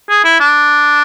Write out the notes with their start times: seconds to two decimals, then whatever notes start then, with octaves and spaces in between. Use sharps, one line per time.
0.09 G#4
0.24 E4
0.40 D4